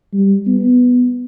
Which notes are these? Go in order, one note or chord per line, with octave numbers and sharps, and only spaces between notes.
G3
B3